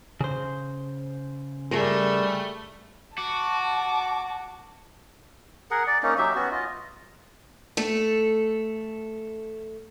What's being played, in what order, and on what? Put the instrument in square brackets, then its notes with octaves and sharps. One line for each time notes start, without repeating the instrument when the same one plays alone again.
[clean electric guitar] C#3 C5
[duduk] G3 [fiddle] A3 [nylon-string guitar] G#4 A#4
[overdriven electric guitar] F#4 [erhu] A5 [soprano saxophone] D6
[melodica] G#4 A#4 F#5
D5
A#3 C#4 D#4
F#3 D#4 G4 E5
B3 C#4 F#4
F4 D#5
[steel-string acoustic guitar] A3 A4